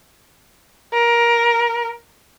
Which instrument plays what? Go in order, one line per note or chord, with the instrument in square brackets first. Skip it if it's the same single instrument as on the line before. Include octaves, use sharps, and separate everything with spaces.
[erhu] A#4